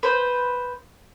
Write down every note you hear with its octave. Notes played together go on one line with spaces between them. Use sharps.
B4 C5